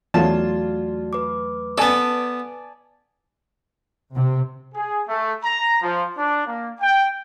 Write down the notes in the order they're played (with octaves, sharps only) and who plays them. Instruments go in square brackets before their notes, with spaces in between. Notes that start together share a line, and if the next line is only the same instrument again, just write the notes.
[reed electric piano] E2 F#3 A3 [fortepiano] F4 A5 [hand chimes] F#4 D5
[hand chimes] B4 D6
[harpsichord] B3 A4 [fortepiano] D5 G#5 A5
[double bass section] C3
[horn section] G#4
A3
A#5
F3
D4
A#3
G5